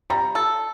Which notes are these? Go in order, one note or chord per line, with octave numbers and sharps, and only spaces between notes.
G3 A#5
A4